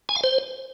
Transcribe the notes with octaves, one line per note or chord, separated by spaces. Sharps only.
G#5
F5
C5